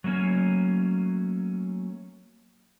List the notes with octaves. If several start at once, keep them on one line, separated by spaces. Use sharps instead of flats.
F#3 A3 A#3 C#4